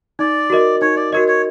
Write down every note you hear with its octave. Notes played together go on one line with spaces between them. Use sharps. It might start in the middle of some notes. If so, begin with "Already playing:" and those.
D#4 D5
F#4 A#4 D#5
D#4 C#5
D5
F#4 A#4 C#5 D#5
C#5